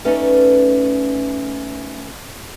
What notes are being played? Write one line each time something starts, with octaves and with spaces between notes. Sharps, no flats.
A3 C#4 D#4 A4 B4 D5